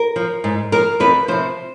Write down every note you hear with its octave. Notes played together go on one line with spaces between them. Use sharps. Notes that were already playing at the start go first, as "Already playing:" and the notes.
Already playing: A#4
F3
G#2
F3 A#4
F2 B4
C3 F3 C5